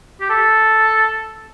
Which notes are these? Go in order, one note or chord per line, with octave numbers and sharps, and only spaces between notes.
G4
A4